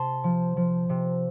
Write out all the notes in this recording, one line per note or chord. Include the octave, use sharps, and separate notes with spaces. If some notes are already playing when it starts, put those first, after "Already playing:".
Already playing: C3 A5 C6
F3
F3
C3